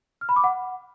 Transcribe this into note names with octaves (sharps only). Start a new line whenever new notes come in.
F6
B5
D6
F#5